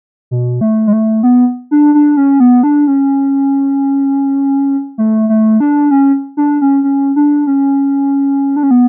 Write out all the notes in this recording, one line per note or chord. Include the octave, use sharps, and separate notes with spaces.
B2
A3
G#3
A3
B3
D4
D4
C#4
B3
D4
C#4
A3
A3
D4
C#4
D4
C#4
C#4
D4
C#4
D4
C#4
B3